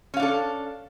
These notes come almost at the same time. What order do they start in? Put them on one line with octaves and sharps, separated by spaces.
C#4 F5 D4 A4